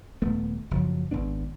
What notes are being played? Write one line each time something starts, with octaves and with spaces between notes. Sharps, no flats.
D#1 A3 B3
F#1 F3 F#3
G#1 B3 D4